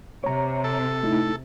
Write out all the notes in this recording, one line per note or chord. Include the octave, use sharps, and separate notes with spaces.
C3 C#5 A#5
A4
A3 D#4 E4